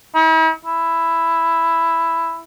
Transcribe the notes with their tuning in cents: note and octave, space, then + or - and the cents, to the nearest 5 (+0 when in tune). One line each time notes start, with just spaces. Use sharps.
E4 -45
E4 +5